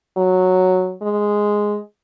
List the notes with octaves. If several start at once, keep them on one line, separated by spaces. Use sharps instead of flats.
F#3
G#3